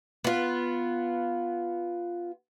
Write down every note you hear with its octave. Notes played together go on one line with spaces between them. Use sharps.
B3 F4